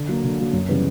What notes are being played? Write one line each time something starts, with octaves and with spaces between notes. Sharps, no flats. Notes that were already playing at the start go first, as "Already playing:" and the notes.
Already playing: D3
F#3 A#3
D3
F#3 A#3
F#2
C#3 E3 G3 B3